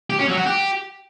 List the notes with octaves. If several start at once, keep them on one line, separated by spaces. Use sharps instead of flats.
G4
C#4
F#3
F#4
G4